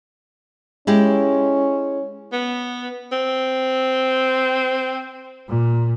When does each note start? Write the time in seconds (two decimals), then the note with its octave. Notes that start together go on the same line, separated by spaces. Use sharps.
0.87 G#3 C#4 E4 G4
2.32 B3
3.12 C4
5.48 A#2